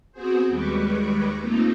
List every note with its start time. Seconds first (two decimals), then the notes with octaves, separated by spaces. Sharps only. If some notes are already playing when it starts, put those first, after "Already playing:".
0.12 B3 C4 F#4 G#4 C5
0.48 D#2 G3 G#3 B4 C#6 D6
1.39 A3 A#3 C4 D#4 F4